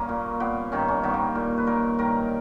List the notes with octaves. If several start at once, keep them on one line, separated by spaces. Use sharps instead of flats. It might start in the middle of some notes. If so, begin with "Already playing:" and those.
Already playing: G2 A#3 C#4
A#2
A#2 B3
G2 D#3 C#4
C#4
G2 D#3 B3
A#3
A#2
B4
A#2 A#4
G2 D#3 A#4